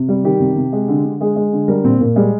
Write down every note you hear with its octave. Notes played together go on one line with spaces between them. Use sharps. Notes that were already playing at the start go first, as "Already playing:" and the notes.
Already playing: C3
G3
D#3 G4
C3
C3
G#3
D3
D3
G#3 G#4
G#3
D3
G3 A#4
A#2 C4
A#2 A#3
G3 G#3